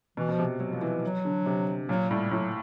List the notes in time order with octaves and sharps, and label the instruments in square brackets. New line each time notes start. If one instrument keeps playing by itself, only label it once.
[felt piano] B2 [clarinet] E3
[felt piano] B2 [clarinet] F3
[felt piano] C3
F#3
F3
E3
[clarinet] F#3
[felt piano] D3
C3
[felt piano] A#2 [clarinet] F#3
[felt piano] A2 [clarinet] G3
[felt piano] A2 [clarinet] F#3